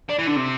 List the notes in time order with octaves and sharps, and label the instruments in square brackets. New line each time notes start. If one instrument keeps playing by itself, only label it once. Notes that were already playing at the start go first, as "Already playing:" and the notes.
[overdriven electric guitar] D4
E3
D3
C3